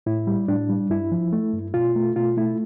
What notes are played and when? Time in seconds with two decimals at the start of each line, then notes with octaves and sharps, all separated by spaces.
0.06 A2 E4
0.27 G3
0.48 A2 D4
0.69 G3
0.90 G2 E4
1.12 F3
1.33 A3
1.53 G2
1.74 B2 F4
1.96 A3
2.16 B2 F4
2.37 A3 E4